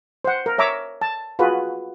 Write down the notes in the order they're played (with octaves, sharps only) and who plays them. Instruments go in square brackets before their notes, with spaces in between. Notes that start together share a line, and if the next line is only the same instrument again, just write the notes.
[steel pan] C5 F#5
A#4
C#5 E5 A#5 D6
A5
F4 F#4 G#4 B4